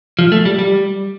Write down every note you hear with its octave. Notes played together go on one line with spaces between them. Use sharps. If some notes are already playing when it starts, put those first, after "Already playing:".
F3
A3
G3
G3